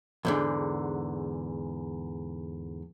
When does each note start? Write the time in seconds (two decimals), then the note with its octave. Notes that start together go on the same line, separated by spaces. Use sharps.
0.25 E2 G#2 D3